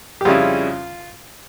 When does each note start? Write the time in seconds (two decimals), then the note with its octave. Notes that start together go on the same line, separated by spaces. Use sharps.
0.21 G4
0.25 F2 C#3 G3 C#4 E4 F4